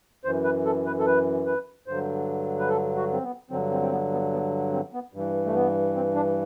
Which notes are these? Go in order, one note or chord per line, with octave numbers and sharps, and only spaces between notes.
F#2 E3 C5
B4
A4
B4
A4
B4
B4
G2 D3 F#3 C5
B4
A4
F#4
C4
B3
G2 D3 F#3 C4
C4
C4
B3
B3
B3
C4
B3
G2 E3
A3
B3
C4
D4